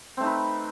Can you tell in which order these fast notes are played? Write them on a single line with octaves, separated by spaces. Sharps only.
C4 A3 D#4 B4